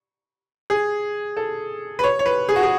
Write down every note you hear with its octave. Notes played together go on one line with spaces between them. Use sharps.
G#4
A4
B4
C#5
C#5
B4
G#4
F#4
G#4